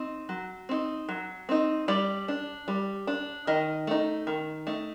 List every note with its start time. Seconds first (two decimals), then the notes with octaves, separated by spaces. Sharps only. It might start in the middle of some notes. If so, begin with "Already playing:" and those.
Already playing: C4 D#4
0.29 F#3
0.69 C4 D#4
1.09 F#3
1.49 C4 D#4
1.88 G3 D5
2.28 D4
2.68 G3
3.07 D4
3.47 D#3 D#5
3.87 A3 D#4
4.27 D#3
4.67 A3 D#4